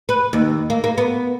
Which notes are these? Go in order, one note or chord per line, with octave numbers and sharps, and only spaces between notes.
B4
D#2
A#3
A#3
B3